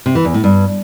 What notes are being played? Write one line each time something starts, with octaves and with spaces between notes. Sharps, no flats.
C3
E3
E2
A2
G2